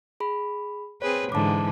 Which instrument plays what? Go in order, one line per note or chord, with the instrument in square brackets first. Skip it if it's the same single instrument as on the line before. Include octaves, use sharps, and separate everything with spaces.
[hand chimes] G#4 B5
[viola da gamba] C4 G#4 B4 [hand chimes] C#5
[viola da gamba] G#2 D3 E3 [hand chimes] A5 D6